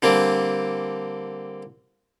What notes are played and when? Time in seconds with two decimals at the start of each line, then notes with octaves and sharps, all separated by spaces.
0.02 D3 G3 A#3 C4